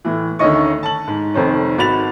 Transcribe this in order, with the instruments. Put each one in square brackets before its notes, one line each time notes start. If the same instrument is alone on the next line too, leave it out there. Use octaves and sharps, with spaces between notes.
[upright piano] A2 E3
D2 D3 D#3 C#4 D#5 C#6
A5 F#7
G#2
F1 F2 D#3 C5 C#5
G#1 F#4 B5 A6 F7